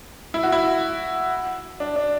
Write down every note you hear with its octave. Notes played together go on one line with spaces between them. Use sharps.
E4
F#4
E4
D4
D4